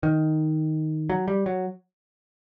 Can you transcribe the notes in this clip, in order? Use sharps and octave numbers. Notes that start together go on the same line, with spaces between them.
D#3
F#3
G3
F#3